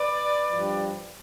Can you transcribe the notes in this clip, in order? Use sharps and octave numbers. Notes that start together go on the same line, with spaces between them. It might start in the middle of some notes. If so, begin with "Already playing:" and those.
Already playing: B4 D5
G2 F3